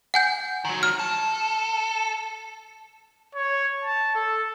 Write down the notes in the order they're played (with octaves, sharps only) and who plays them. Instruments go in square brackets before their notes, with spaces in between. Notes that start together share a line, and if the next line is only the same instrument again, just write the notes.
[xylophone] F#5 G#5 G6
[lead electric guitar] D#3 F#3
[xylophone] F6
[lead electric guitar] A4
[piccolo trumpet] C#5
A5
A4